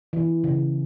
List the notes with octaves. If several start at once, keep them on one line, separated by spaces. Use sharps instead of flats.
E3
C#3